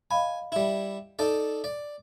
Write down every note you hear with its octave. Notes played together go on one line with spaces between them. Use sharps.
D#5 F5 G#5 B5
G3 E4
D#4 A4 D5
D5